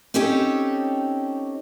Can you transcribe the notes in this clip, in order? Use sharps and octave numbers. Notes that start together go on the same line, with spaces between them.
C4 C#4 D#4 G4 A4 C#5